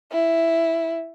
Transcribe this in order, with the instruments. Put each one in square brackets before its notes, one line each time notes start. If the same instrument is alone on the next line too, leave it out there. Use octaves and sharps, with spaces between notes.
[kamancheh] E4